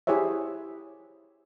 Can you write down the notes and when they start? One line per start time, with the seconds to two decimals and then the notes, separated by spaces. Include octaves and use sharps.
0.07 E4 G4 G#4 C5 C#5 E5